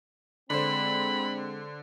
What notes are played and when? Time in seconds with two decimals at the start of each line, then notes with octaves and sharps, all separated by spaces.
0.50 D3 G#3 C4 C5 B5